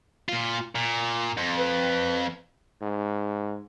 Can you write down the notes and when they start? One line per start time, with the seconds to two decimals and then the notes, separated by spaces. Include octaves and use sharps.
0.29 A#2 F4
0.75 A#2
1.38 F2
1.59 B4
2.82 G#2